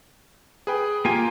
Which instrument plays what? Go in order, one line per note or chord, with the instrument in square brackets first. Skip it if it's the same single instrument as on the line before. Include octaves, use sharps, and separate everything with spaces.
[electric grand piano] G#4 B4 G5
[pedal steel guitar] A#3 G#5 [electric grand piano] F4 G4 G5